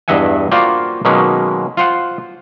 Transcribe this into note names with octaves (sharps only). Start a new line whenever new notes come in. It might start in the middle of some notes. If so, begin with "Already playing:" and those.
E2 G2 D#5 E5 F#5 G#5
A#3 F4 F#4 C5 D5 G5
B2 D#3 F#3 G#3 A#3 C#4
F4 C5 F#5